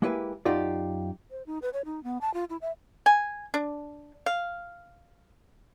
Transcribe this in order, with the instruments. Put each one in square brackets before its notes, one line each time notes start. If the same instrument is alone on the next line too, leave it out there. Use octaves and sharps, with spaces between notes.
[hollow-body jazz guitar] G#3 A#3 E4 G4 B4 G#5
F#2 D#4 F4 G4 D5
[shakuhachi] C5
D#4
B4
C#5
D#4
B3
A5
F4
E4
E5
[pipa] G#5
D4
F5